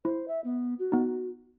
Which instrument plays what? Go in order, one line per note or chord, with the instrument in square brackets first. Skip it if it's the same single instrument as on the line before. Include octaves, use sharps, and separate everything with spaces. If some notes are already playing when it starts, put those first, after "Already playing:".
[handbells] E4 [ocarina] C5
[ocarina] E5
B3
F#4
[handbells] B3 D#4